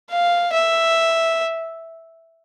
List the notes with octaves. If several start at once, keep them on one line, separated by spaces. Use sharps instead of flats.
F5
E5